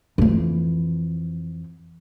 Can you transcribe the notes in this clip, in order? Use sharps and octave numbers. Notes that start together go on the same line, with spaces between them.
F2 E3